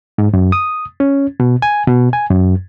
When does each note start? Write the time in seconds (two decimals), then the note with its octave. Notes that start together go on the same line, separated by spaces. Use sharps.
0.18 G#2
0.33 F#2
0.52 D#6
1.00 C#4
1.40 B2
1.62 G#5
1.88 B2
2.13 G#5
2.31 F#2